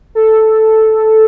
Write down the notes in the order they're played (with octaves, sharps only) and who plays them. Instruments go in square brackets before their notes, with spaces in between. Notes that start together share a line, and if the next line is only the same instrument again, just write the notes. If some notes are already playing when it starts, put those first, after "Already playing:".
[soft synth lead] A4